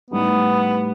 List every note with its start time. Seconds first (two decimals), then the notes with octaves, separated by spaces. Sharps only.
0.10 A2 G3 B3 D#4 G4